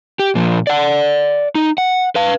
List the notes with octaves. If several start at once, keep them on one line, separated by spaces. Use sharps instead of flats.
G4
A#2 F3
D5 F#5
D#4
F#5
B4 F5